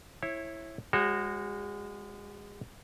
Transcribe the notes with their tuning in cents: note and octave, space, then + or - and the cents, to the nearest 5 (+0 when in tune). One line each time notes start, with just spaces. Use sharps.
E4 +0 C#5 -25
G#3 -30 F#4 +0 C5 +40